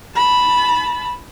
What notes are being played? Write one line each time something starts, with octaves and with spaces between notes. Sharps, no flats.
A5 B5